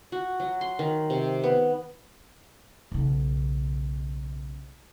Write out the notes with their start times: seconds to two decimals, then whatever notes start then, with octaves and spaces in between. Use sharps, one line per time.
0.12 F#4
0.40 F#3
0.61 C6
0.79 D#3
1.10 C3
1.44 B3
2.92 B1 C#3